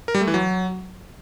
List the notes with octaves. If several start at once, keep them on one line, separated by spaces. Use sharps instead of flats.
A#4
G3
A3
E3
F#3